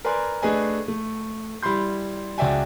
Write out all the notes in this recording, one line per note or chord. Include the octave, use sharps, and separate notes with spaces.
A#4 B4 D5 G#5 C6
A3 D4 G#4 B4 D#5 G#5
A3
G3 E4 B5 C6 G6
C#2 F#4 D5 E5 G5 G#5